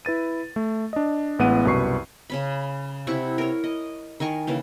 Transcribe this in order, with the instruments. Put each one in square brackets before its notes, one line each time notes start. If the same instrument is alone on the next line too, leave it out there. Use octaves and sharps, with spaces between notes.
[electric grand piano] E4 B4 A6 D#7
A3
D4 D#5
A1 G#3 B3 E4 F#5 D#7
C2 F#2 B2 B4 C#6 C7
[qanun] C#3 C#4 B5
C3 E4 F#5 C#6
A#4 C#5
D#5
D#3 A#4 G#5 C#6
C#3 E3 A#3